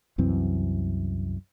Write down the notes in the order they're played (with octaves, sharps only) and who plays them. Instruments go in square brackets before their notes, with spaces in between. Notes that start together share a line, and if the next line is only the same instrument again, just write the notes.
[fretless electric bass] C2 F#2 E3 C4